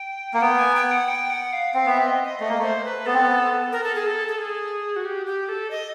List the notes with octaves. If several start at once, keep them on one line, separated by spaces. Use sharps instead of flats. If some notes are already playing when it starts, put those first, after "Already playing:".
Already playing: G5
A#3 F#5
B3 G5
G#5
G5
F#5
G5
F#5
F5
C4 F5
B3 E5
C4
D#5
D#5
A3 D#5
A#3
A3 C5
B4
B3 A4
C4
B3
A#4
A4
G#4
A4
A4
G#4
F#4
G4
G4
A4
D#5